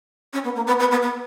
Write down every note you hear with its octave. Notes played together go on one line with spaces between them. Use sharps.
C#4
B3
A#3
B3
B3
B3
B3